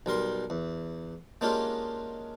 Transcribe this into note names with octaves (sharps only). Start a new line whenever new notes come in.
B1 G3 A#4 C6
E2
G#3 A#3 C#4 D4 F4 G4